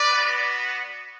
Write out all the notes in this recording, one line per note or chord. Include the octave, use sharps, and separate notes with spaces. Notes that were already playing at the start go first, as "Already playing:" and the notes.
Already playing: B4 D5
B3 F#4